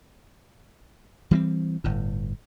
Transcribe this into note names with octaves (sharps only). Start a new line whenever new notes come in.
E3 G3 B3 C4
G1 A2